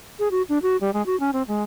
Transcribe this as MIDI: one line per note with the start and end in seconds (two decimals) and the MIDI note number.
0.19 0.28 68
0.31 0.42 66
0.49 0.58 62
0.62 0.77 66
0.81 0.93 55
0.94 1.05 56
1.06 1.18 66
1.20 1.31 61
1.33 1.43 60
1.48 1.63 56